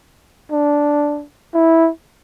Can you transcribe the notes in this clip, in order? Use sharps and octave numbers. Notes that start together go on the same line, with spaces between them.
D4
E4